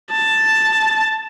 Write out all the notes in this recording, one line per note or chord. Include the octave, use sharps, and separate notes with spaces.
A5